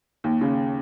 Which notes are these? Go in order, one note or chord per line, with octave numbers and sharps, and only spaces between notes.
D#2
C#3